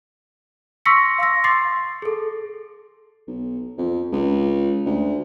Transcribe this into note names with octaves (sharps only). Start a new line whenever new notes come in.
C6 C#6 E6 A#6 B6 C#7
F5 C6 E6 A#6
C6 D6 A6 C7
G#4 A4
B1
F2
C#2
D2